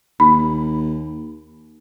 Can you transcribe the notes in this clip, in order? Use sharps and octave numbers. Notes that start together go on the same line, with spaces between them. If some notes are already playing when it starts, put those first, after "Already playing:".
D#2 B5